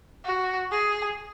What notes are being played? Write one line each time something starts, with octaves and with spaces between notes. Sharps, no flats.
F#4
G#4